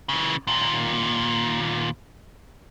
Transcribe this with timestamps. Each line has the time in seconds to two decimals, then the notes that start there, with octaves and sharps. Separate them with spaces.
0.09 C#3 E3
0.47 D#2 A#2